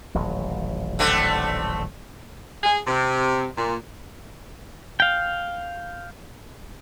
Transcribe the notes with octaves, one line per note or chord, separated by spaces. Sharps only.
D#1 A1 F#3
D3 A3 C4
G#4
C3
A#2
F5 G5